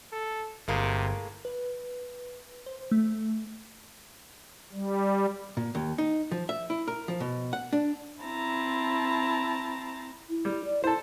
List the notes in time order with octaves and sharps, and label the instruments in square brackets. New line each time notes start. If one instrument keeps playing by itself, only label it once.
[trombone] A4
[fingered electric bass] G1 [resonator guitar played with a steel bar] A2 G#3 A#3 [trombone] C3
[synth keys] B4
C5
A3
[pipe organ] G3
[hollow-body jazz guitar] A#2
D#2
D#4
F3
E5
E4
A#4
F3
B2
F#5
D4
[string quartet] C4 E4 A5 A#5
[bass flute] E4
[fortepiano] G3
[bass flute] D5
[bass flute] E4 [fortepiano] A4 C5